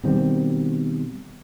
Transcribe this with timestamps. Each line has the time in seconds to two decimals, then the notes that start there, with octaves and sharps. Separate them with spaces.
0.04 B2 D#3 G3 C4